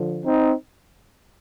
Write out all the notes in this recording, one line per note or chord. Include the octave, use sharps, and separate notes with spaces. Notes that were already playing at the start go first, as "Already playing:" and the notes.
Already playing: D3 F3
C4 D#4